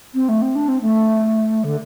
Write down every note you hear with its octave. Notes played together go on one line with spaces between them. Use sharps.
C4
A3
C4
D4
C4
A3
D3